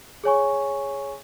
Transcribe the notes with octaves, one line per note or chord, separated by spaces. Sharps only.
G#4 C#5 G#5 C#6